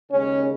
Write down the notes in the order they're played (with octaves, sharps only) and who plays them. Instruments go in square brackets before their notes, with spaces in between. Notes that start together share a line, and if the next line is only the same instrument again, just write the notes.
[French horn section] D#2 C#3 G#3 C#4 C#5